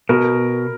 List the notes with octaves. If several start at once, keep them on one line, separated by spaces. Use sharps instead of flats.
B2 A#4